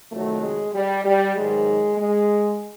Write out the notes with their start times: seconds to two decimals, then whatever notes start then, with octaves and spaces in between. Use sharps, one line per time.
0.12 F2 C3 D#3 F#3 A3
0.43 G#3
0.74 G3
1.05 G3
1.36 G#2 D#3 F#3 G#3
1.98 G#3